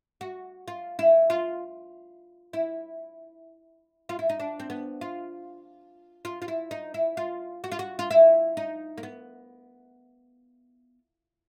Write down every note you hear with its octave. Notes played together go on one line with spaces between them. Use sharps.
F#4
F4
E4
F4
E4
F4
E4
D#4
D4
C4
B3
F4
F4
F4
E4
D#4
E4
F4
F#4
F4
F#4
F4
E4
D#4
A#3
B3